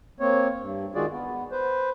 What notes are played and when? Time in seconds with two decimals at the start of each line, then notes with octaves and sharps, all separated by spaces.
0.20 A#3 C4 C#5
0.60 G2
0.95 D#3 G#3 F4 F#4 G#4 D5
1.10 B3
1.52 B4 C5